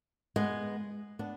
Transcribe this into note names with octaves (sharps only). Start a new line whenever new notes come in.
G#3 B3
B3 D4